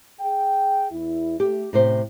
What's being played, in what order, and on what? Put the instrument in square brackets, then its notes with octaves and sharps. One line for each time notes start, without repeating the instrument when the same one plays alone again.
[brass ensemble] G#4 G5
E2 E4
[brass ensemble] A3 [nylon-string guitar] G4
[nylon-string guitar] A2 C3 C5 [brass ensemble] C#4